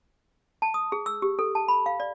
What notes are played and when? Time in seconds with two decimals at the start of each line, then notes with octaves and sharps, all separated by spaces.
0.62 A5
0.74 D#6
0.92 G#4
1.06 E6
1.22 G4
1.39 A4
1.55 A5
1.68 B5
1.86 F5
2.00 D5